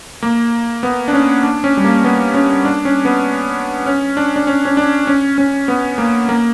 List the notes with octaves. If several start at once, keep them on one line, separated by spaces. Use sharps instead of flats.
A#3
B3
D4
C#4
D4
C#4
G3
A#3
B3
C#4
D4
C#4
B3
C#4
D4
D4
C#4
C#4
D4
C#4
C#4
B3
A#3
A#3